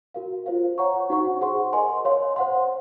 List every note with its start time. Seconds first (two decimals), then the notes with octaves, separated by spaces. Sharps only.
0.14 F#4 A#4 F5
0.46 F4 C5 F5
0.78 C#5 F#5 A#5 C#6
1.10 D#4 F#4 C5 F#5 C#6
1.41 G#4 C5 F#5 C6
1.73 A#4 D#5 G#5 C6
2.05 C#5 F5 C6
2.36 C5 F#5 C6